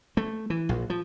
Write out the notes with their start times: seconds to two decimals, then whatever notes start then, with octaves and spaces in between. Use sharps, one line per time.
0.17 A3
0.50 E3
0.69 A#1
0.90 F3